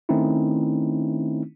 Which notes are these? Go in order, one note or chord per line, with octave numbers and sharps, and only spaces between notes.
D#3 A3 C4 C#4 D#4 E4